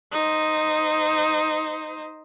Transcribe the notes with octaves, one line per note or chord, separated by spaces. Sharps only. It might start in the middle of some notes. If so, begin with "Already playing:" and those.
D#4 C5